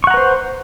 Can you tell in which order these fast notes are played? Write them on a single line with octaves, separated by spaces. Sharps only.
C#6 F#5 A#5 B4 C5